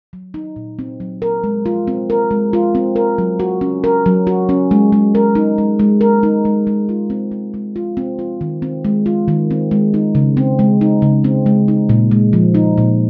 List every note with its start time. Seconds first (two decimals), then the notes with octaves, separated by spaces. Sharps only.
0.13 F#3
0.34 D#4
0.56 A#2
0.79 C4
1.00 F#3
1.22 A#4
1.44 G#3
1.66 F4
1.88 C4
2.10 A#4
2.31 G#3
2.53 F4
2.75 C4
2.96 A#4
3.18 F#3
3.40 F#4
3.61 C#4
3.84 A#4
4.06 F#3
4.27 F#4
4.49 C#4
4.71 G#3
4.92 G#3
5.15 A#4
5.35 D#4
5.58 G#3
5.79 G#3
6.01 A#4
6.23 D#4
6.45 G#3
6.67 G#3
6.89 F4
7.10 C4
7.32 G#3
7.54 G#3
7.76 F4
7.97 C4
8.19 F4
8.41 D#3
8.62 C4
8.85 G#3
9.06 F4
9.28 D#3
9.51 C4
9.71 G#3
9.94 D#4
10.15 C#3
10.37 C4
10.59 G#3
10.81 D#4
11.02 C#3
11.24 C4
11.46 G#3
11.68 D#4
11.89 A#2
12.11 G#3
12.33 F3
12.55 D#4
12.78 A#2